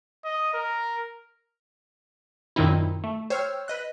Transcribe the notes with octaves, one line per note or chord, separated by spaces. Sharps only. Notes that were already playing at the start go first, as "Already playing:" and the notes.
D#5
A#4
F#2 A#2 D#3 C4 D#4 E4
A3
C5 C#5 G5 E6 F6
B4 D#5 F#6